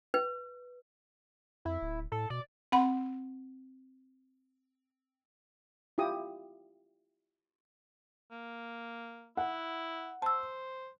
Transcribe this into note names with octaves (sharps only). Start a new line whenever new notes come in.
B4
F2 E4
D1
A2 A4
B2 D5
C4 F#5 B5
E4 F4 G4 D#6
A#3
E4 F#5
C5 A5 E6